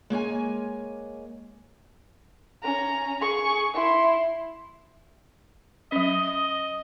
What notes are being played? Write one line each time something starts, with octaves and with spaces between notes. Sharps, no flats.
G#3 A#3 C#5 G#5
C#4 A#5
G#4 C#6
E4 C6
F#3 C#4 D#5